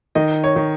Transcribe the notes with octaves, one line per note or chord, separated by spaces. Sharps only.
D#3 D#5
C#5
D#3